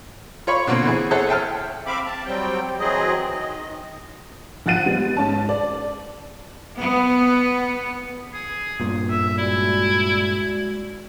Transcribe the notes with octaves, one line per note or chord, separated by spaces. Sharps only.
F4 C#5 B5 C#6
B2 D3 A#3 C4
E3 E4 G#4
G#4 A4 C5 C#5 E5 F#5
E5 G5 A5 F6
C4 E5 F5 B5 D6
A5
F#3 G3 C4 G5
E3 F#3 C4 G#4 D#5
D#3 D#5
A#1 F4 F#5 A6 D#7
G3 G#3 B3
G#2 C#4 A5
D5
B3
G#4
G2 A#2
E5
G#3 E4 F#4 D5